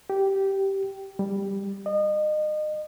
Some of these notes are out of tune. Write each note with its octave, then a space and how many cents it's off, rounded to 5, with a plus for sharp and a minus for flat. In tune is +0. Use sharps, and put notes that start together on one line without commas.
G4 -10
G3 +10
D#5 -30